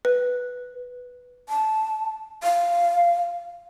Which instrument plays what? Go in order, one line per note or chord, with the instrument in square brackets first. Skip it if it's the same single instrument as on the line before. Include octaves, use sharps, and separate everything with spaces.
[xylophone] B4
[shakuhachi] A5
F5